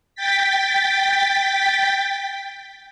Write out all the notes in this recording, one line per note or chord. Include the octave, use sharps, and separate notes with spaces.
G5 A6 B6